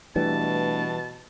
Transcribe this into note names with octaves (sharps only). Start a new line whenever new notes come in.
B2 E3 G3 A3 D4 B4 A5